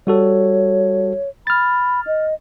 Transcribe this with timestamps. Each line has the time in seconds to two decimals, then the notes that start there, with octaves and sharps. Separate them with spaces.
0.07 G3 F#4 A4 C#5
1.47 B5 F6 A6
2.07 D#5